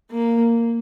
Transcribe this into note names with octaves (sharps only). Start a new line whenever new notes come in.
A#3